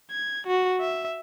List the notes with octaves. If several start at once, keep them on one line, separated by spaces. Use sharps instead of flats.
G#6
F#4
E5